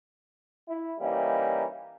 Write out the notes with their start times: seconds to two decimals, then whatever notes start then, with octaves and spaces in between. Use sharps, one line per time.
0.68 E4
1.00 E3 G3 A#3 C#4 D#4 E4